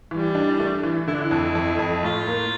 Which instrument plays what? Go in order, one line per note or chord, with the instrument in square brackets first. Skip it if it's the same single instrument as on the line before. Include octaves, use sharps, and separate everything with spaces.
[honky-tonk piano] E3 [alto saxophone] G3
[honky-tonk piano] D4
A3
E3
[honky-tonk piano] D3 [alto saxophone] E4
[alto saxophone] D4
E4
[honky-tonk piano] F2
F2
F2
[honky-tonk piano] A2 [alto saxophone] F4
[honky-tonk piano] A#3